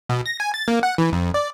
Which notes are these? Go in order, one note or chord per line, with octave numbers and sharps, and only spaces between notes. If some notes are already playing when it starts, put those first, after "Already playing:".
B2
A#6
G#5
A6
A#3
F#5
E3
F2
D5